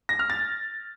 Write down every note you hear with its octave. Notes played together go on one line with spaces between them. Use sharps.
A#6
F6
A6